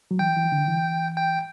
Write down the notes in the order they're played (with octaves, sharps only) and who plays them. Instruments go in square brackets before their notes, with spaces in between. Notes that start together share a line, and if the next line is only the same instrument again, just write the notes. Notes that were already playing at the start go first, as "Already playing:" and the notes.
[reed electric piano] F#3
[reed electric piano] E3 [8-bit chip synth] G5
[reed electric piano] E3
D3
E3
[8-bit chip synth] G5